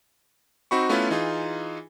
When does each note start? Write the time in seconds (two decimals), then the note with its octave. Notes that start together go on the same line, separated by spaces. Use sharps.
0.71 C4 D#4 F#4 B5 C#6
0.89 A3 B3 C#4 E4 F4 B4
1.10 E3 D#4 F4 G#4